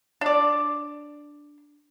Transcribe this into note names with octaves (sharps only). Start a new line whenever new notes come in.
D4 D5